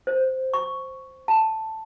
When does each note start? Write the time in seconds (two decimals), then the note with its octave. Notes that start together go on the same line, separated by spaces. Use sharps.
0.07 C5
0.54 C#6
1.28 A5